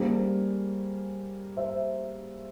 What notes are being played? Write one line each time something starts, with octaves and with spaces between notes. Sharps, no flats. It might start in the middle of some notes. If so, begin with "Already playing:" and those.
Already playing: G3 A#3 C#4 G#4 C5
C5 E5